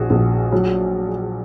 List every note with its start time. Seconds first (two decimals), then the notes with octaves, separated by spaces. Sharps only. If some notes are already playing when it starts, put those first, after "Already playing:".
Already playing: A#1 F#4 G#4
0.10 A#1
0.52 F#3